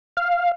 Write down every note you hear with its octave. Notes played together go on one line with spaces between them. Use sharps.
F5